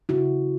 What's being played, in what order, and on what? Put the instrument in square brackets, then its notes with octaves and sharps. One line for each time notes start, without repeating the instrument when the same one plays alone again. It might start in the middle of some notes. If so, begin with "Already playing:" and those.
[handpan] C#3 E4 F#4